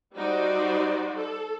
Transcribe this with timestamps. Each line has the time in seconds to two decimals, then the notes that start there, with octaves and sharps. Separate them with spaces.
0.17 G3 D#4 F#4 C5 D5
1.17 A4